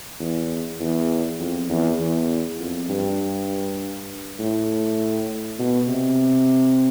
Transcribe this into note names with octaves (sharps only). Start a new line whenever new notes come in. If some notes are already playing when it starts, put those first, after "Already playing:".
E2
E2
F2
E2
E2
F2
G2
A2
B2
C3